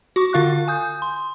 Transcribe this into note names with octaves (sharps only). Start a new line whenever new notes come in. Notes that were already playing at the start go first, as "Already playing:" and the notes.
F#4 C#6 D6
D3 F4 F5 C#6 F#6
G#5 D#6 G6
C6